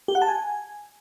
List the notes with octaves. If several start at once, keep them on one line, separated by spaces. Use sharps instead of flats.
G4
F#5
A5
G#5